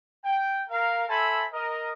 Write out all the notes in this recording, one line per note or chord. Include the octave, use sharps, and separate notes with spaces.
G5
A#4 F5
A4 C5 E5 G#5 A5 B5
A#4 D#5